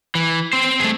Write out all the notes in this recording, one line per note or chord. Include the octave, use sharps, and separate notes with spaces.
E3
C4 C5
A3 G#4